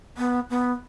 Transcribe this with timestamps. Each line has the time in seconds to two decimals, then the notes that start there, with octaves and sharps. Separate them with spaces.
0.17 B3
0.50 B3